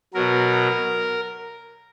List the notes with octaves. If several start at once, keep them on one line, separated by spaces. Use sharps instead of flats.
B2 F#3 A#4